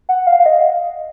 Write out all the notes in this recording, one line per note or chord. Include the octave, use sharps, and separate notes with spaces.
F#5
F5
F5
D#5